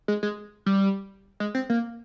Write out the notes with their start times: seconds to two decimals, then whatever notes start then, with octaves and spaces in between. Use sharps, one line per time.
0.08 G#3
0.23 G#3
0.66 G3
1.40 G#3
1.55 C4
1.70 A#3